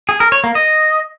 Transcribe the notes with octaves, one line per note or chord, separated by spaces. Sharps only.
G#4
A#4
C#5
A#3
D#5